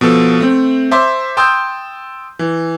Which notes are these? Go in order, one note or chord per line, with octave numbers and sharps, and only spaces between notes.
B2 F3 A4
A3 C4
C5 E5 A5 C6 D6
G5 A5 C6 D#6 E6 G6
E3